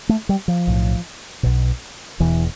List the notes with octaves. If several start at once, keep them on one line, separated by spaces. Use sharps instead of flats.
A3
G3
F3
B1 A2
B1 B2
E1 E2 B2 E3